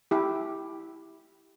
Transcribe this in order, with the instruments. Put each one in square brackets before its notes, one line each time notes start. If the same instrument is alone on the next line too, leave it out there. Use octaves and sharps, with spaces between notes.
[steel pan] E4 G4